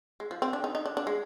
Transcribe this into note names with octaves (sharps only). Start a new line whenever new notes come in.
G#3
F3
C4
D4
D#4
D#4
D4
D4
G#3